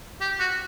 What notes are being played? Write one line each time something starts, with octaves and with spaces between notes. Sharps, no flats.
G4
F#4